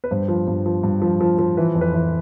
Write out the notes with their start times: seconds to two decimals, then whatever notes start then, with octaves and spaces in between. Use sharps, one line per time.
0.04 B4
0.11 G2 C5
0.28 F3
0.47 G2
0.66 F3
0.83 G2
1.02 F3
1.20 F3
1.39 F3
1.57 E3 B4
1.75 F2
1.81 B4
1.94 E3